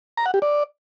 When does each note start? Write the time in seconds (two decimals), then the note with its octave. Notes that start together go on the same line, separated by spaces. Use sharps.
0.17 A#5
0.26 F#5
0.34 G4
0.42 D5